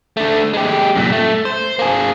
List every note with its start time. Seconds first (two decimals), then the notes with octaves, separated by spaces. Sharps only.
0.17 D3 A3
0.53 G#3 G4
0.96 F#2 A#2
1.12 A3
1.45 C5
1.79 A#3 G#4